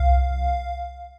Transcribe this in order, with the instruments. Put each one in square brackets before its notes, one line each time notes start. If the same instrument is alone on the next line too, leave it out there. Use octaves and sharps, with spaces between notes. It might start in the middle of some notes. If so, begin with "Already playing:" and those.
Already playing: [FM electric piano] C2 F5